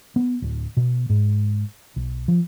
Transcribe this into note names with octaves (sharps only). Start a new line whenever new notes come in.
B3
D1
B2
G#2
B1
F3